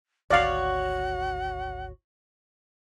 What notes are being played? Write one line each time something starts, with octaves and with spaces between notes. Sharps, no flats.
G#1 D2 F#4 C#5 D5 F5 F#5